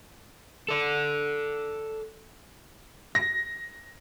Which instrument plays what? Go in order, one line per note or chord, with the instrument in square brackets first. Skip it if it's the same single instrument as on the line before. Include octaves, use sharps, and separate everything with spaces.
[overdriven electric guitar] A4 D5
[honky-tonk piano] A#6